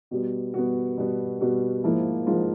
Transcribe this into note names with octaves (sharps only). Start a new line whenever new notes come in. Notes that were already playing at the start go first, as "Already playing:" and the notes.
B2 G3 B3 F#4
B2 G3 B3 F#4
B2 G3 B3
B2 G3 B3 F#4
G#2 F3 A#3 E4
G#2 F3 A#3 F4